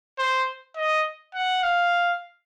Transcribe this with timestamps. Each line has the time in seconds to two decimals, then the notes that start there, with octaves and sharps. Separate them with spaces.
0.18 C5
0.76 D#5
1.34 F#5
1.63 F5